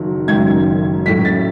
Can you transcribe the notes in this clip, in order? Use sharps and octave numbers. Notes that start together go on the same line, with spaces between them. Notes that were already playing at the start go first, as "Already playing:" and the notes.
Already playing: F#1 F#2 D#3 F#3
F#1 F#2 D#3 F#3 G#6
A2 F#3 C#4 B6
A6